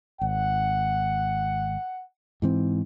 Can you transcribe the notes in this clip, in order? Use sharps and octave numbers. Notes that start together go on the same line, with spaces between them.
G#1 F#5
G#2 E3 C4